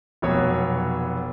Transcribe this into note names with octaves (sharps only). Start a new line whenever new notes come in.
F1 B2 F#3 C#5